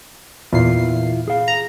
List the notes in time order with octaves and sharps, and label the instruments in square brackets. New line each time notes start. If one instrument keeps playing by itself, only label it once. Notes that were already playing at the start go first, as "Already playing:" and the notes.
[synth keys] E2 A#2 C7 [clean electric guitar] E4 F4
[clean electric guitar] G#4 F5
[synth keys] A#5